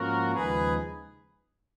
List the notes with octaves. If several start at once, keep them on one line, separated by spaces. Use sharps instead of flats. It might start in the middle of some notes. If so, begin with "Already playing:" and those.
Already playing: G#2 F3 A#3 C#4 F4 F#4 A#4
D#2 C#3 F3 G#3 D#4 G#4 B4